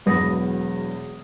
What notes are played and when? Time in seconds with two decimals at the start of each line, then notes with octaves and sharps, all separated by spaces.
0.06 E1 E2 F#3 B4 D#6 A#6